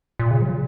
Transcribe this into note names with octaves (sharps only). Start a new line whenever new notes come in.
A#2
C#3
F#3